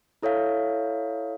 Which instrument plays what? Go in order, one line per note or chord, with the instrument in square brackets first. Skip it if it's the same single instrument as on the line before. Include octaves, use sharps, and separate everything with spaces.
[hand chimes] E4 A4 C#5 E5 F5